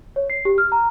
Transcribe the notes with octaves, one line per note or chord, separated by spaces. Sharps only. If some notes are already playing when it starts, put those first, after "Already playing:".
C#5
C7
G4
F6
A#5